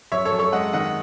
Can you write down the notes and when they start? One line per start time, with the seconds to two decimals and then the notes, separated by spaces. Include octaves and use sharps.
0.12 F#2 C#5 E5
0.25 A4 C#5
0.32 F#2
0.39 A4 C#5
0.52 G#3 D#5 F#5
0.73 D#3 D#5 F#5